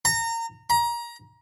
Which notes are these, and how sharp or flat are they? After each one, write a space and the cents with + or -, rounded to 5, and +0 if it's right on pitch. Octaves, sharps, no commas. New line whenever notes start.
A#5 -25
A#5 +25